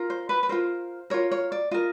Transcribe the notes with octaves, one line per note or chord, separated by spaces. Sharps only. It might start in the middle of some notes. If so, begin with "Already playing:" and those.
Already playing: F4 A#4
C5
B4
B4
F4 A#4 C5
F4 A#4 C#5
C#5
D5
F4 A#4 D#5